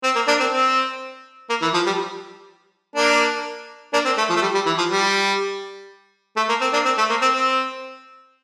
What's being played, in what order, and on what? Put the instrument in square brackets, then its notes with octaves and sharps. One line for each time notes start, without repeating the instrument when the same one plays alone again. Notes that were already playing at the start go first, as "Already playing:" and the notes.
[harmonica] C4
A#3
A#3 D4
C4
C4
A#3
E3
F3
G3
A#3 D4
A#3 D4
C4
A3
F3
A3
G3
G3
E3
F3
G3
A3
A#3
C4
A#3 D4
C4
A3
A#3
C4
C4